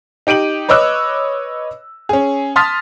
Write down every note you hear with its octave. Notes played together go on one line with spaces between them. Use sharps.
D#4 G4 D7 D#7 F#7
B4 C#5 D#5 D6 E6 F#6
C#4 G#4
A5 C6 D#6 F6 A6 B6